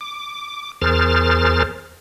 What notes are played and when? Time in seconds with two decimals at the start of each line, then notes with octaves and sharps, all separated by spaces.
0.01 D6
0.82 E2 G#4 A#4 C5 F6 A6